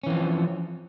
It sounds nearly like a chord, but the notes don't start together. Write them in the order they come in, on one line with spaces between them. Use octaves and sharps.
C#4 E3 C4 F3